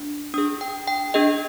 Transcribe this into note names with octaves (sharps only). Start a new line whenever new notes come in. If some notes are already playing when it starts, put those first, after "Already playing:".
Already playing: D4
D4 G#4 D#6
G5
G5
D4 G#4 D#5